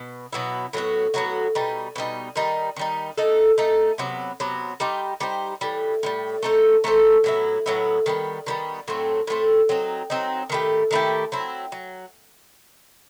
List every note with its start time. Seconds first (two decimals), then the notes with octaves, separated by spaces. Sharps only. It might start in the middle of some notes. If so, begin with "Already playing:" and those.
Already playing: B2
0.33 B2 F#3 B3 E4
0.73 A2 F#3 B3 F#4
1.14 A2 F#3 B3 F#4
1.55 B2 G3 D#4
1.96 B2 G3 D#4
2.36 D#3 G3 D#4
2.76 D#3 G3 D#4
3.18 A3 D#4 A4
3.58 A3 D#4 A4
3.98 C3 F#3 B3
4.40 C3 F#3 B3
4.80 G3 D#4 G4 C5
5.20 G3 D#4 G4 C5
5.61 A2 E3 G3
6.03 A2 E3 G3
6.43 A3 D#4 A4 C5
6.84 A3 D#4 A4 C5
7.24 A2 F#3 B3 E4
7.66 A2 F#3 B3 E4
8.06 D#3 G3 B3
8.46 D#3 G3 B3
8.88 A2 F#3 A3 C4
9.27 A2 F#3 A3 C4
9.69 F#3 C4 D#4
10.10 F#3 C4 D#4
10.50 D#3 A3 E4 G4
10.91 D#3 A3 E4 G4
11.32 F#3 C4 E4
11.72 F#3